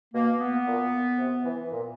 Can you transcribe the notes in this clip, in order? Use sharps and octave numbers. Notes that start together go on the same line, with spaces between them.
B2 A#3
B3
A#2
C3
E3
A#2